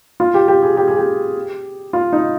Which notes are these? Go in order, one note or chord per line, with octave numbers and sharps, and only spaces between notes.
F4
G4
G4
G#4
G4
G#4
G4
F4
D#4